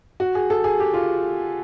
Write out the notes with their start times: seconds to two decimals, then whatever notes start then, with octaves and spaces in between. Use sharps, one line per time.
0.20 F#4
0.35 G#4
0.50 A4
0.64 G#4
0.80 G4
0.94 F4